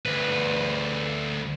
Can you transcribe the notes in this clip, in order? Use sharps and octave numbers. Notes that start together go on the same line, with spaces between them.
D2 B4